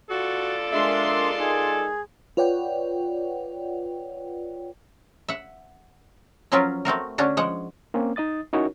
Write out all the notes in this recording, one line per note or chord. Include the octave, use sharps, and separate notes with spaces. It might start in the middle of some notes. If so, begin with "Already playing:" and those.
F4 F#4 A4 D5
G#3 D4 A#4 E5 C6
D#4 G#4
F4 B4 C#5 D5 F#5 G5
E5 F#5
F3 F#3 C#4 F4 A#4 B4
A3 C4 F#4 A#4
D3 C#4 D4 F#4
F3 G#3 F#5
A#3 C4 C#4
D#4 D#5 D#6 A6
C#4 D#4 E4 F#4 A#4 C#5